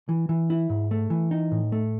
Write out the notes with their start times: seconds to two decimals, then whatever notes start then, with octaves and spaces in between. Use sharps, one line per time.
0.09 E3
0.29 E3
0.50 E4
0.70 G#2
0.91 A3
1.10 E3
1.31 D#4
1.52 A2
1.72 A3